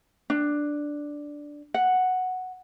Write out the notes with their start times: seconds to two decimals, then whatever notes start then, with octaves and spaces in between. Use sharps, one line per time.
0.30 D4
1.74 F#5